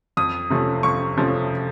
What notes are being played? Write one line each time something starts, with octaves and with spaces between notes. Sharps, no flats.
F2 D#6
C3 F3 A3 C#4
F2 C#6
C3 F3 A3 C#4